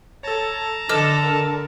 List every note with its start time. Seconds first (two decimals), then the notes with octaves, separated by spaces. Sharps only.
0.23 A4 C#5 A5 A#5
0.89 D3 A4 D#5 D6 F6
1.24 A#4